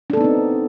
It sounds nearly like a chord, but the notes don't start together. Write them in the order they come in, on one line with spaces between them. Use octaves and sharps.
D4 A4 B3 D#4 C4